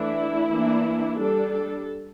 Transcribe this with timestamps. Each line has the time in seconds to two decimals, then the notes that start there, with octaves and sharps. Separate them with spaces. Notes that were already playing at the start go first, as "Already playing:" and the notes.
Already playing: E3 A3 D4 E4
0.50 E3 A#3 D4
1.17 G3 D4 A4
1.51 A4